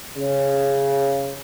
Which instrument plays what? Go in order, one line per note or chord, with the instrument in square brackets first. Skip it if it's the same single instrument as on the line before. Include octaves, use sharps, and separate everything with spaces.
[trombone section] C#3